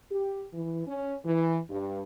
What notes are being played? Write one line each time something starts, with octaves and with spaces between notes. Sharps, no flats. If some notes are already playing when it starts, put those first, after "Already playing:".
G4
E3
C#4
E3
G2